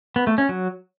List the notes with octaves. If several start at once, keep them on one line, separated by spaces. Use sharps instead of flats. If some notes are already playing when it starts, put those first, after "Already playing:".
B3
A3
C#4
F#3